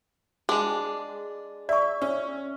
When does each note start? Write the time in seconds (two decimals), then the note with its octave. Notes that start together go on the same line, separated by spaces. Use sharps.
0.49 G#3 D4 G#4
1.69 D5 E5 C#6
2.02 C#4